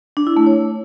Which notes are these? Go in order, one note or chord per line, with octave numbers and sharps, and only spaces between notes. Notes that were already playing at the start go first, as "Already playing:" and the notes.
D4
E4
A3
C#5